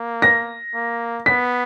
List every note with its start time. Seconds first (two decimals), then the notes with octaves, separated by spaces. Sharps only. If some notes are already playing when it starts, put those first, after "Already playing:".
Already playing: A#3
0.22 A#6
0.75 A#3
1.26 B3 B6